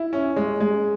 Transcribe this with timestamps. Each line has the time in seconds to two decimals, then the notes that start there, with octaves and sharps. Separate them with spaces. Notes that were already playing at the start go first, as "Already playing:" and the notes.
Already playing: E4
0.13 C#4
0.36 G#3
0.60 G#3